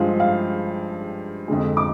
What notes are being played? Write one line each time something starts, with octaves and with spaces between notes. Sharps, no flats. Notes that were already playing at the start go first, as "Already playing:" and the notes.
Already playing: G2 F3 G#3 F5
F5
F2 D3 G#3
D6